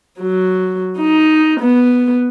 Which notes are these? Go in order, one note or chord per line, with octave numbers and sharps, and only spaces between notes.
F#3
D#4
B3